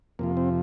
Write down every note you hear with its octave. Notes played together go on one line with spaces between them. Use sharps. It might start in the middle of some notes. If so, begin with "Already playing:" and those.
F2 C3 F3 A#3
C4